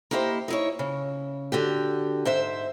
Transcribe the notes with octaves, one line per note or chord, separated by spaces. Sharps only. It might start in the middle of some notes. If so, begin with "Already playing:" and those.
A#3 D#4 E4 G4 A4 C5
D#4 E4 C#5
C#3
D3 F#4 G4
G#2 C5 E5